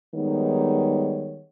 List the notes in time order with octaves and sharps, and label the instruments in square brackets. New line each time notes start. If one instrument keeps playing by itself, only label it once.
[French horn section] D#3 G3 G#3 B3 D#4 C#5